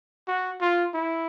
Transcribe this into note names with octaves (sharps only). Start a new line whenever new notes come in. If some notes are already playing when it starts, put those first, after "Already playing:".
F#4
F4
E4